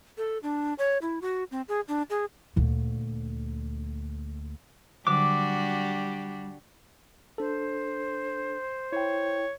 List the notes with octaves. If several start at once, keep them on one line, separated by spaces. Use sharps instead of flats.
A4
D4
C#5
E4
F#4
C4
G#4
D4
G#4
D2 A#2
D3 F#3 G3 D4 F#4 G4 D6
D4 A4 C5
E4 C#5 G5